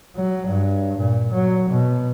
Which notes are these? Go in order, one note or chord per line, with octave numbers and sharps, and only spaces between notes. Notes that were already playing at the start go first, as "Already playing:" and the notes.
F#3
G2
A#2
F#3
B2